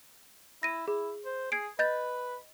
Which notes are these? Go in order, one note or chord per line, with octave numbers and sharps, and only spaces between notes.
E4 A#6 D#7
E4 G#4
C5
G#4 G#6 C7 D7
B4 D#5 G6 A6